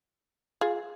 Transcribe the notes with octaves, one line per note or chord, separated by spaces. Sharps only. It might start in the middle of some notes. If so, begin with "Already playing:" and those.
F4 G#4